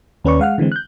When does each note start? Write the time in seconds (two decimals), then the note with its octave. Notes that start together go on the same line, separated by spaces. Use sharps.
0.24 D#2 C#4 B4 D5 C#6
0.40 G#3 F5 F#5 F6
0.58 D3 E3 G#3 C4
0.72 F#6 G6